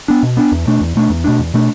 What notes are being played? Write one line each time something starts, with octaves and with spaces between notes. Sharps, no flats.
B3 D4
B2
B3 D4
E2
B2 A3 D4
E2
B2 A3 D4
E2
B2 A3 D4
E2
B2 A3 D4